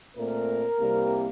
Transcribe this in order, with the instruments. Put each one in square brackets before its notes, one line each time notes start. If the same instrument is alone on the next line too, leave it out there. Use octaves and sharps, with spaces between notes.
[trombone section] A#2 A3 C4 A#4
C2 C3 G3 A#3